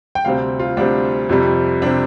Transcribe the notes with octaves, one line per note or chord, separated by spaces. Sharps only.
G5
D2 C3 G3 C4 F5
F4
D2 C3 G3 C4 D4
F2 C3 G3 C4
C3 G3 C4 D4